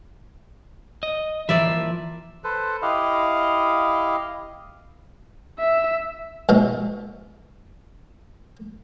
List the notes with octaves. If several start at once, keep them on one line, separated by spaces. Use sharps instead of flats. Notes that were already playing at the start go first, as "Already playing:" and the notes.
D#5
E3 F3 A#3 D5 E5
A4 B4 C5
E4 G4 D#5 F5
E5
A#1 G#2 B2 A4 E5 F5